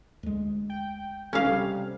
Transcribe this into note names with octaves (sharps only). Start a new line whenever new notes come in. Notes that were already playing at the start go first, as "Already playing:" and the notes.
D2 G#3
G5
C2 C#3 C#4 F5 F6
C3 G3